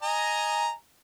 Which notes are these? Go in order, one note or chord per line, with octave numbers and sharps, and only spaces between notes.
D#5 G#5 A#5